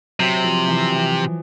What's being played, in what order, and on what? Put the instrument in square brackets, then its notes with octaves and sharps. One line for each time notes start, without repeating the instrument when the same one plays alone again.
[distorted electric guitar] C3 [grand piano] F#3
[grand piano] F3
E3
E3